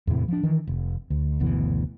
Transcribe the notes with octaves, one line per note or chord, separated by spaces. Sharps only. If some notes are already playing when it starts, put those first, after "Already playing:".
E2 A2 C3 E3
F3 D4
D#3 E3
F1
D2
F#1 D2 B2 E3